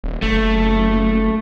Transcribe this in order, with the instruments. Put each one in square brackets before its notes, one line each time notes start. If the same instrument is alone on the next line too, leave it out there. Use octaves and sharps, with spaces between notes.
[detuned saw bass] D#1
[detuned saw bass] F#1 [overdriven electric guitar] A3